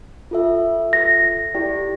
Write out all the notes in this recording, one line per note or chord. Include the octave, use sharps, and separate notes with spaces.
F4 A4 E5
A#6
E4 G4 D5 G5